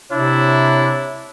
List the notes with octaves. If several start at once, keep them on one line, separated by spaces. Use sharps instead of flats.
C3 D4 E4 C#5